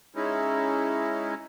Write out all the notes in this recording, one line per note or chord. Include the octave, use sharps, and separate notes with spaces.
G#3 C#4 D#4 E4